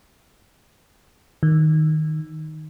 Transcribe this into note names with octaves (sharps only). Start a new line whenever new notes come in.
D#3